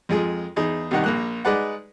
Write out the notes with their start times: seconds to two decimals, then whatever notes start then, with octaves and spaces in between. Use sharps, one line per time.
0.09 F2 G#3 F4 G#4
0.56 E2 D#4 G#4
0.91 C2 C3 D#3 D#4 F#5
1.04 A#1 A#3 F#6
1.45 G#3 D#4 G#4 B4 D5 F#5